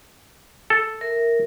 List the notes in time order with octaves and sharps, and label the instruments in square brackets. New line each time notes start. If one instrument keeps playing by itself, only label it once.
[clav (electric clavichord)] A4
[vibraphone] A#4 E5